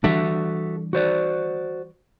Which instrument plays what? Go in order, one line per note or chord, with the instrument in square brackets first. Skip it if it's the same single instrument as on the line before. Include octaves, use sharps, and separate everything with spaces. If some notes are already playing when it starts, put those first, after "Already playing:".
[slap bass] E3 G3 D4 [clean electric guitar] F#4 A4 E5
[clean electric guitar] F#4 C5 D5